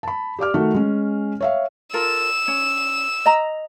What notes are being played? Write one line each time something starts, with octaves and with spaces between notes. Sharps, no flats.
A5 B5
G4 D5 D6 F6
D#3 A3 F#4
G#3 C#4
C#5 E5 F5
F4 A4 A#4 E6
C#4
D#5 A#5